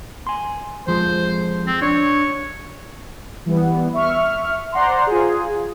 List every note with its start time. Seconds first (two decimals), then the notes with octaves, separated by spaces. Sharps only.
0.27 G#5 C6
0.87 F2 F3 G#3 C5
1.67 C4
1.82 D4 C#5
3.46 E3 G3 B3
3.93 E5 C#6 F6
4.72 C5 D5 F#5 A#5 C6
5.07 F4 G#4